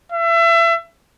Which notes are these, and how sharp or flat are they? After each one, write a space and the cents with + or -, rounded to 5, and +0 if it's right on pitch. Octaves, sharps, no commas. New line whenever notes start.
E5 +30